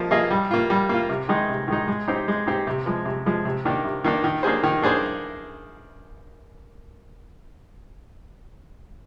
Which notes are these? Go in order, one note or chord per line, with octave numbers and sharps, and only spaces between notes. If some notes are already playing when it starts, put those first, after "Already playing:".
Already playing: F3 A#3 D#5
A#3 F4 G#4 D#5
G3
A#3 F4
G3
A#3 F4
C3
D#3 G#3 D#4
C3
D#3 G#3 D#4
G#3
C4 D#4 G4 C5
G#3
C4 D#4 G4 C5
C3
F3 G#3
C3
F3 G#3
C3
D#3 A#3 D4
C3
D#3 A#3 D4
D#3
A#3 D4 G#4 C5
D#3
A#3 D4 G#4 C5